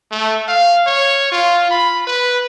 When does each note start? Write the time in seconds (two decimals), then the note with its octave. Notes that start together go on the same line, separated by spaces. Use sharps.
0.11 A3
0.48 F5
0.86 C#5
1.31 F4
1.71 B5
2.07 B4